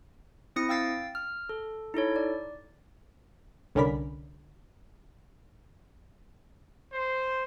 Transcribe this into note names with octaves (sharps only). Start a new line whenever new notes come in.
C4 E4 D#6 A#6 C#7
F5 G5 E6 A6 C7
F6
A4
D#4 E4 A4 C#5
D5
C2 D3 C#4 A#4 D5 B5
C5